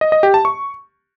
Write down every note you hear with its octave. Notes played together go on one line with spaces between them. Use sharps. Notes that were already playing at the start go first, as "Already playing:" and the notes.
D#5
D#5
G4
A5
C#6